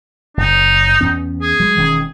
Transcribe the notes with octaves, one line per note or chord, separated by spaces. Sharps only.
F#1 D#4
E2 B3 C#4
G#4
F#3 G#3
E1 D#3 C#4